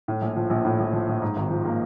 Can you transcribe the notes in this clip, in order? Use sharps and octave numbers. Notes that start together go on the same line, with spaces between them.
A2
A#1
F3
A#1
A2
A#1
F3
A#1
G#2
G#1
F3
A#3